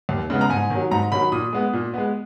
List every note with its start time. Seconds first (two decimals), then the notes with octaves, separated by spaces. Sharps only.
0.09 D#2
0.30 C#3 G#3 B3
0.41 A#5
0.50 G#2 G#5
0.70 D#3 F#3
0.91 G#2 A#5
1.12 D#3 F#3 B5
1.32 A#2 D#6
1.53 G#3 B3
1.73 A#2
1.94 G#3 B3